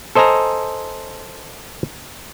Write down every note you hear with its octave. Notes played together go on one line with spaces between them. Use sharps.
A4 C5 D#5 G#5 A#5